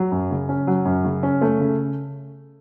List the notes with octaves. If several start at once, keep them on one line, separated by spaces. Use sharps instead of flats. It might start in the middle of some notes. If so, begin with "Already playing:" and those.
Already playing: F#3
F#2
C#3
C#4
F#3
F#2
C#3
C#4
A3
C#3